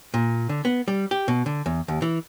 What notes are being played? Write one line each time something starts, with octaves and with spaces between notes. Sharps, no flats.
A#2
D3
B3
G3
G4
B2
D3
E2
D#2
E3